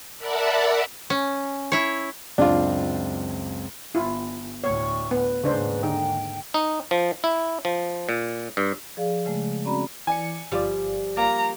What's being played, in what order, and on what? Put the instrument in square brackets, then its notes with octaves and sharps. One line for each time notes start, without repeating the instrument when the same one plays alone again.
[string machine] A#4 D5 E5 F#5 A5 B5
[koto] C#4
E4 C#5
[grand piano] C#2 F#2 C4 [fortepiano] D4 F4
[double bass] G1 [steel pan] E4 F4
[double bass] D2 A2 [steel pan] C#5 [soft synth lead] C#6
[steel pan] B3 [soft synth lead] B4
[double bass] D#2 G#2 [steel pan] C#3 D4 C5 [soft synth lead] B4
[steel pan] D3 D#4 [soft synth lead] G5
[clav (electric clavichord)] D#4
F3
E4
F3
A#2
G2
[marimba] F3 G#4 D5 F5
C#3 G#3 A3
C4 C#4 F#4 D5 A#5 B5
[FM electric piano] E3 D5 C#7 [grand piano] G#5
[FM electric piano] G1 F4 D5 [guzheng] F3 G3
[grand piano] A#3 [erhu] A#5